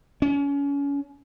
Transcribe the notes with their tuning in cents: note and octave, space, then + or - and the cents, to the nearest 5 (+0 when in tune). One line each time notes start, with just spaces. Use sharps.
C#4 +30